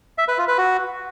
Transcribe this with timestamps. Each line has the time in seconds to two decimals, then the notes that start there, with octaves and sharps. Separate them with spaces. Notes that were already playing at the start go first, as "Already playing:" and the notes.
0.18 E5
0.28 B4
0.38 F4
0.48 B4
0.58 F#4